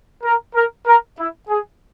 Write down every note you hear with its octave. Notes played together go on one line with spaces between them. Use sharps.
A#4
A#4
A#4
E4
G#4